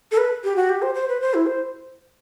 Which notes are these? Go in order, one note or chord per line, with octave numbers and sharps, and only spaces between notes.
A4
B4
G4
F#4
G4
C5
C5
B4
C5
E4
C5